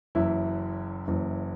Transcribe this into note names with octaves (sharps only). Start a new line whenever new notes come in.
F#1 F#2 E3 E4
F#1 F#2 E3